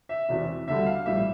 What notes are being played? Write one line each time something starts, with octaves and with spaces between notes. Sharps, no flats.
E5
E1 E2 C3 E3
D2 D3 G3 E5
F5
A#1 A2 E3 G3 E5